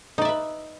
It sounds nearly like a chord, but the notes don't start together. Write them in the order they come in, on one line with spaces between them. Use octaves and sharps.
D#4 D5 E5 B4